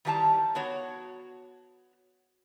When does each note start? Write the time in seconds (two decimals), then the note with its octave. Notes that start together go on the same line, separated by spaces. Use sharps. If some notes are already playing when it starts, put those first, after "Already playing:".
0.05 D#3 E3 G3 E5 A5 A#5
0.55 B3 F#4 C#5